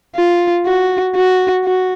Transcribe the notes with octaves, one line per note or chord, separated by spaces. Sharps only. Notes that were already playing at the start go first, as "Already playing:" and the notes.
F4
F#4
F#4
F#4